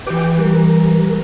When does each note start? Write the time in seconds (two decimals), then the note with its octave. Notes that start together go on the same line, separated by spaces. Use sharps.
0.07 E3 G4 B4 G5 D6
0.38 G3 A#4